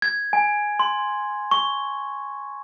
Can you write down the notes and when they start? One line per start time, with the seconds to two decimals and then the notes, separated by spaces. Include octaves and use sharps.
0.02 G#6
0.33 G#5
0.80 C6
1.51 C#6